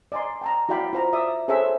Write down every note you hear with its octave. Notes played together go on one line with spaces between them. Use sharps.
D5 D#5 G#5 A#5 C6
G5 A5 A#5
E4 F#4 D5 F5 G5 B5
F4 C5 A#5
D5 E5 D#6
G#4 A4 C5 C#5 E5 G#5